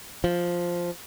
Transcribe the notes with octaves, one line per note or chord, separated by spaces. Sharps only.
F3